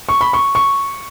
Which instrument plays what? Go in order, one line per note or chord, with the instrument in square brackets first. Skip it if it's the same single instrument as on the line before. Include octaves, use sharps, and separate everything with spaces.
[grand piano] C#6
B5
C#6
C#6